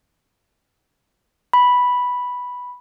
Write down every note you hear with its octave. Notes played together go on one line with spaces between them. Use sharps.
B5